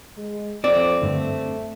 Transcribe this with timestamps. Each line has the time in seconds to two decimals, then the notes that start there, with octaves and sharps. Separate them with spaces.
0.17 G#3
0.64 F2 C4 D5
1.02 G2 D3 A3